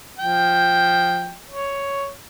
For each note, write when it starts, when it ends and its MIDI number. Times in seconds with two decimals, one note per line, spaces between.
0.19 1.33 53
0.19 1.33 79
1.49 2.10 73